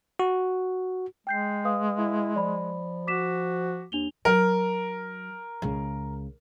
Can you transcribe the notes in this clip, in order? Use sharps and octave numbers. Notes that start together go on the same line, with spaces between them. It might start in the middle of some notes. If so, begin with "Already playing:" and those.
F#4
G#3 G5 G6 C7
B4 F5 D#6
E4
F3 D5 B5
F#4 D6 B6 E7
D#2 D4 F7 G7
F#3 A#4
C#2 C#3